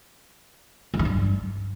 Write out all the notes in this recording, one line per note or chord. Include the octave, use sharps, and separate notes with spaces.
G3
E3
G2